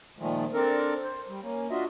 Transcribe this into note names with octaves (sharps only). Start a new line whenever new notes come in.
A#2 D#3 F3 G#3 A3
C4 D4 A4 A#4
C5
G3
A#3 C#4
D4 F4 F#4 D#5 E5